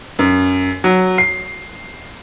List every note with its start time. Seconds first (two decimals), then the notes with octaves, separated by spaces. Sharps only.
0.19 F#2
0.84 F#3
1.18 C7